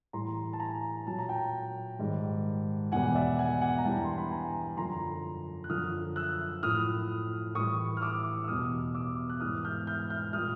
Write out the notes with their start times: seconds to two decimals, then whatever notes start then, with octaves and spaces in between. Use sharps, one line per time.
0.13 A2 E3 G3 A#5 C6
0.53 A5
0.60 G#5 A#5
1.07 A#2 F#3 A5
1.19 A#5
1.29 G5 A5
1.99 G#2 D#3 G3
2.92 E2 B2 G3 F#5 G#5
3.15 D5 E5
3.39 F#5 G#5
3.61 F#5 G#5
3.78 A#5
3.85 G2 E3 G3 G5 A5
4.04 C6
4.18 B5
4.31 G#5 A#5
4.77 F#2 D3 F3 A#5 C6
5.64 F#6
5.70 F#2 D3 F3 D#6 F6
6.16 E6 F#6
6.63 A2 F3 D#6 F6
7.55 A2 E3 G3 C#6 D#6
7.97 F6
8.01 D6 E6
8.44 E6
8.48 E2 B2 G3 D#6 F6
8.95 D6 E6
9.30 F#6
9.40 G#2 E3 G3 D#6 F6
9.64 F6 G6
9.87 F6 G6
10.10 F6 G6
10.33 A#2 G3 D#6 F6